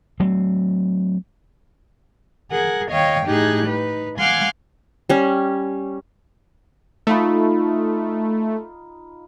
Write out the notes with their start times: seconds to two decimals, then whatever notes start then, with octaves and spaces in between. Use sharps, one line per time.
0.20 F#3 A3 C4
2.51 G#4 A#4 F#5
2.89 D#2 C#5 D#5 F5 G5
3.26 A2 D#4 G4 G#4 F#6
3.65 D#4 B4
4.19 F5 F#5 G#5 C6 D6 F6
5.09 G3 C#4
7.07 A3 D#4 F4 B5